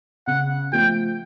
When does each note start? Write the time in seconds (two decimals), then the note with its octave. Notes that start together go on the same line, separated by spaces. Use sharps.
0.27 C#3 F#5
0.72 F3 A3 G5